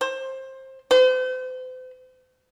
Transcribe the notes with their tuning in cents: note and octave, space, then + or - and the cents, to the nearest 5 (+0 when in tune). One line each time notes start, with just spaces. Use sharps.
C5 +20
C5 -40